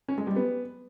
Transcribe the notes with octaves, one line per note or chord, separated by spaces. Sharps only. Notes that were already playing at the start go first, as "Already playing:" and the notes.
C#4
G#3
G3
B3